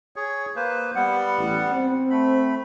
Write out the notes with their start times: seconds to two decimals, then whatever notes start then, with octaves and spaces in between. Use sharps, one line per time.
0.16 G#4 C#5
0.56 A#3 B4 C5
0.95 G3 B3 F#5
1.38 A1
1.72 C4
2.11 A3 B5